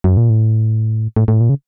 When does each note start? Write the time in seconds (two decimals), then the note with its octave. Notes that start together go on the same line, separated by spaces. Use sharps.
0.04 F#2
0.17 A#2
0.30 A2
1.16 A2
1.28 A2
1.41 A#2
1.49 C#3